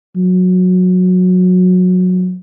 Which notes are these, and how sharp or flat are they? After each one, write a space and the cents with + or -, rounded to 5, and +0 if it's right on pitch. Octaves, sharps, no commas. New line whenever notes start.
F#3 -20